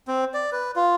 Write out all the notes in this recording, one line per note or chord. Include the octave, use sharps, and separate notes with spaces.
C4
D5
B4
F4